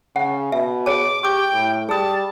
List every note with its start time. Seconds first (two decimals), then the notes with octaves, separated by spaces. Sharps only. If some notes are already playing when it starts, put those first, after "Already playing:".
0.16 C#3 F#5
0.52 B2 E5
0.86 G#4 C#5 A5 D6
1.23 G4 G5 C#6 D6
1.53 A2
1.89 G3 G#4 A5 D#6